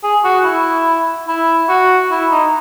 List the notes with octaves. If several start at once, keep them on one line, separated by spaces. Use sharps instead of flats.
G#4
F#4
E4
E4
F#4
E4
D#4